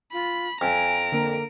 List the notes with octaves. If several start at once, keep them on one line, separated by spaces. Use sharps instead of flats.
F4 B5
F2 G#5 A#5 D7
D3 A#3 A#4